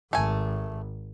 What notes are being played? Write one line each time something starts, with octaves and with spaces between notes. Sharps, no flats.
G#1 A3 G#5